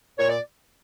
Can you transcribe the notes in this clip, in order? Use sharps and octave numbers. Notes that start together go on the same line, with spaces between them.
A#2 C#5
D5